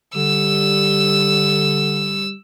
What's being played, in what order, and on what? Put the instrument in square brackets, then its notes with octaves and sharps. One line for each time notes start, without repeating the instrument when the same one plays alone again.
[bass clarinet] D3 [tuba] G3 [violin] E6